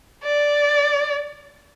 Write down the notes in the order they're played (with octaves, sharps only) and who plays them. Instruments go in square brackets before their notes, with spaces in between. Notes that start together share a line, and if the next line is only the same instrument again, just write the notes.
[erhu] D5